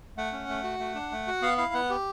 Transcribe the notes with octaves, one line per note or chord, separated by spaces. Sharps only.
A3 F#5
C#4
A3
F#4
A3
D4
A3
F#4
B3 F5
E4 F5
B3 F#5
G4